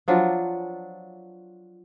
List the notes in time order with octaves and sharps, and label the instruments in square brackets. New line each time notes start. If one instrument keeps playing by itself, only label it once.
[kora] F3 F#3 D4 F4